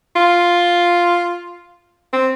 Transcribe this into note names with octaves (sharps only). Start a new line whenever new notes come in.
F4
C4